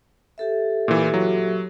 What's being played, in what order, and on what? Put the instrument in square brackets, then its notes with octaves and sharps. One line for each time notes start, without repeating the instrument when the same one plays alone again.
[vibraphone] G4 A4 E5
[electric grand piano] A#2 E3
F#3